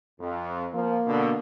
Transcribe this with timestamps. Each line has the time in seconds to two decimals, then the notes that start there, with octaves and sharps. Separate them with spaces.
0.20 F2
0.74 F3 A#3
1.07 B2 D3